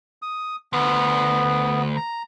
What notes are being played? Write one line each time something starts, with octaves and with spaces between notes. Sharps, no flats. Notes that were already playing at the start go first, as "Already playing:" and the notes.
D#6
D2 B3
A#5